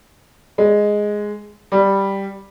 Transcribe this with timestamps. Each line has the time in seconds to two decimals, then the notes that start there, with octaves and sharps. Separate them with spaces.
0.58 G#3
1.72 G3